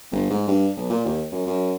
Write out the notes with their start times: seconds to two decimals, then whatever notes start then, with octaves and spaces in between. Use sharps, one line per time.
0.12 G1
0.30 G#2
0.48 G2
0.77 B1
0.90 A#2
1.05 D#2
1.32 F#2
1.47 F#2